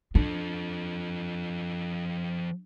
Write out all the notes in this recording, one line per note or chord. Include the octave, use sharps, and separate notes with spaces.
F3 D4 A4